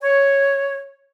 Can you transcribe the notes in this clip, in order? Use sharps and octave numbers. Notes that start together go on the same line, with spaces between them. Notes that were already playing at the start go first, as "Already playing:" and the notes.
C#5